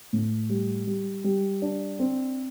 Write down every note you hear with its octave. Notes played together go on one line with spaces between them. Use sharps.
A2
G3
G3
G3
D4
C4